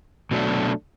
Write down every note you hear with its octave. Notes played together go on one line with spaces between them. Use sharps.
B2 F#3 A3 D4